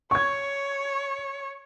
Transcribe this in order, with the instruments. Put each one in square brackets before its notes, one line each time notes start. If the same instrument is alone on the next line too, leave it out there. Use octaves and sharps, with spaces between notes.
[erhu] C#5 [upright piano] C#6 G#6